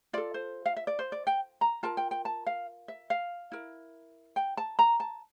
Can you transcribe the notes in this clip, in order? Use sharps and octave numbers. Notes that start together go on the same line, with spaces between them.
F4 A4 D5
C5
F5
E5
D5
C5
D5
G5
A#5
F4 A#4 A5
G5
G5
A5
F5
E5
F5
E4 A#4
G5
A5
A#5
A5